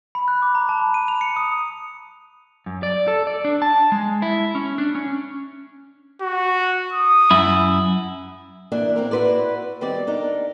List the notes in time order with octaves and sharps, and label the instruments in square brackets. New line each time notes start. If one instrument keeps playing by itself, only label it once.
[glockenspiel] B5
F#6
D6
A#5
A5
B5
D#7
F7
C#7
D#6
[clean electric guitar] F#2
D5
A4
D5
D4
A5
G#3
E4
C#4
D4
C#4
[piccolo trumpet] F#4
D#6
[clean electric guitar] F#2 E4
[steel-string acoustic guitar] E3 A#3 D4 E5
A#3 C4 E4 A#4
E4 F#4 B4 C5 D5
D#3 G3 C4 D5
D4 D#4 A#4